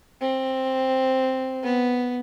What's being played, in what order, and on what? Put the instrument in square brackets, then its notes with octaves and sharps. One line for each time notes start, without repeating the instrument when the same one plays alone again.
[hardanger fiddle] C4
B3